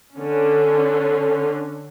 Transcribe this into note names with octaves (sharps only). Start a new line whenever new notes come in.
D3 C#4